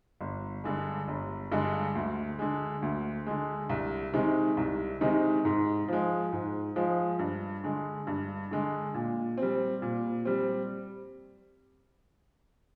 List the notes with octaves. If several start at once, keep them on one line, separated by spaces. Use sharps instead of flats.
G1
G2 D3 G#3
G1
G2 D3 G#3
D2
D3 G#3
D2
D3 G#3
C2
C3 D#3 G#3 D#4
C2
C3 D#3 G#3 D#4
G#2
F3 G#3
G#2
F3 G#3
G2
D3 G#3
G2
D3 G#3
A#2
G3 C4
A#2
G3 C4